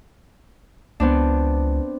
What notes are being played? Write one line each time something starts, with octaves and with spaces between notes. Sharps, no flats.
C#2 B3 C4 D4